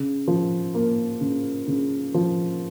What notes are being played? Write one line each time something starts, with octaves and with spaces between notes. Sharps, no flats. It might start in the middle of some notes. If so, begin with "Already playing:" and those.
Already playing: C#3
F3
A#3
C#3
C#3
F3